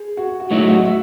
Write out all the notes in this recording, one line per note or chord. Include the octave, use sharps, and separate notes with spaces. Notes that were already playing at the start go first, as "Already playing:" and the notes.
Already playing: G#4
F#4
F#4
A2 F#3 A3 D#4 E4
F#4
E5